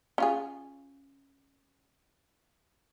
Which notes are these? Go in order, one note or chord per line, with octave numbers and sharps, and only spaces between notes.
C#4 F4 G#4